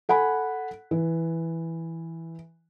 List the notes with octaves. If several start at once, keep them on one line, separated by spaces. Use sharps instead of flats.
A4 F#5 G#5 B5
E3